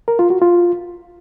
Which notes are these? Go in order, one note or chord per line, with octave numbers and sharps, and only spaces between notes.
A#4
F4
F#4
F4